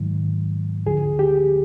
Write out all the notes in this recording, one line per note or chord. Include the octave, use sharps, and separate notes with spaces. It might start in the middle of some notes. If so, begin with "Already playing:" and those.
Already playing: G#2 D#3 F#3
D2 D3 F3 G#4
G4